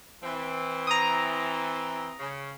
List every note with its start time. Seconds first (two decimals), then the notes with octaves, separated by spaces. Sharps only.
0.23 E3 C4
0.87 A#5 D#6
2.19 C#3